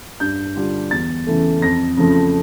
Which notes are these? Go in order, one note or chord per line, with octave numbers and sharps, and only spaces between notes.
G2 G6
D3 G3 D4 F4
E2 A6
C#3 E3 A3
F2 A#6
C#3 F3 A3